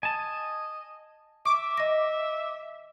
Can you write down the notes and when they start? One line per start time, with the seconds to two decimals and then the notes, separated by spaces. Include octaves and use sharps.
0.03 D#5 G#5 A5
1.45 E5 C#6 D6
1.77 D#5 A#6